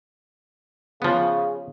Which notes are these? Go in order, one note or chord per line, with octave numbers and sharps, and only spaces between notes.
C#3 F3 B3 G#4 C#5